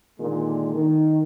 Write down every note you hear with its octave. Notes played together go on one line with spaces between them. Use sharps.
A#2 D3 D#3 G#3
D#3